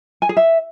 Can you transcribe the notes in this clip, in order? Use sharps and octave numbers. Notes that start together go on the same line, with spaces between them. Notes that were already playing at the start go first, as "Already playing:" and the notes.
G#5
G#4
E5